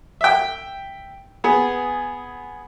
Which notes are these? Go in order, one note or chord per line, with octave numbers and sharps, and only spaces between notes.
E5 G5
B3 G#4